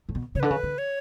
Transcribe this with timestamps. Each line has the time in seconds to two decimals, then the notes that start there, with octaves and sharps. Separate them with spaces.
0.09 A2
0.15 B2
0.35 C#3 C#5
0.40 D3 B4
0.51 C#3
0.63 D3
0.78 C#5